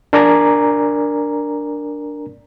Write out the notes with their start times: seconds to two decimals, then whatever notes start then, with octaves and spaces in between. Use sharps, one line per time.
0.13 D4 A#4 D5 G#5 A#5